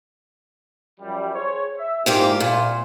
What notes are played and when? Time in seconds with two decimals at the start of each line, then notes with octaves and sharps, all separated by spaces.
1.00 F#2 F3 G3
1.34 G#4 C5 C#5
1.78 E5
2.06 C2 G#2 A#3 F4 G4
2.40 A#2